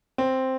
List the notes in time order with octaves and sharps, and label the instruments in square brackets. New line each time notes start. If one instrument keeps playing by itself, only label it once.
[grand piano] C4